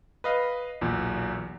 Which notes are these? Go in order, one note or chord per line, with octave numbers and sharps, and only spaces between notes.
B4 D#5 F5
B1 E2 A#2